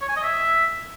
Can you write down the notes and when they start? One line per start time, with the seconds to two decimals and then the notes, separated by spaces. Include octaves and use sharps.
0.01 C#5
0.09 G#5
0.16 D#5
0.24 E5